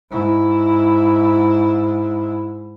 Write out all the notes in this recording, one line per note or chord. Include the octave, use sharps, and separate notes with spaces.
G#2 E4